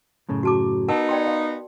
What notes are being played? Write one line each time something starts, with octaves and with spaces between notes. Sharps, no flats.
F#2 A2 C#3
F#4 A5 D6
B3 D#4 A#4 F#5 A5
D5 G5 C6
F5